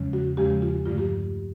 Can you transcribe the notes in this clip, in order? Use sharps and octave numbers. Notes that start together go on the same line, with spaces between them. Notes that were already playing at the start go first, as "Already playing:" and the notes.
Already playing: E2 C#3 F3 G#3 C#4
F#4
E2 C#3 F3 G#3 C#4 G4
F4
G2 D3 F3 A3 F4
G4